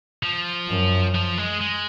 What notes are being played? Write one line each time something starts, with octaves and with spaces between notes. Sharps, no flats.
F3
F#2
F3
G#3
G#3